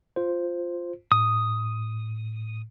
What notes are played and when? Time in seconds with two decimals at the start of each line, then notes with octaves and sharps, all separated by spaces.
0.16 F4 C5
1.12 A2 D#6